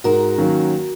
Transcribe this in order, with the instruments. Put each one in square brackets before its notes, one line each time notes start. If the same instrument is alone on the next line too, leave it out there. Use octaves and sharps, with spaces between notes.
[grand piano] G#2 [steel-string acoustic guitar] F#4 A#4
[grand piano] D#3 F#3 A#3 C#4